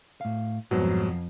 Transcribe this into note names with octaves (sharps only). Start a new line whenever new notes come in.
A2 F5
F2 G#2 B2 F#3 G3 C5